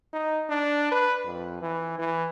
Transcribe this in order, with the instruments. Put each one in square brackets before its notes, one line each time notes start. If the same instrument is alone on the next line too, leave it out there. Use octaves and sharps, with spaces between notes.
[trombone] D#4
D4
B4
F2
E3
E3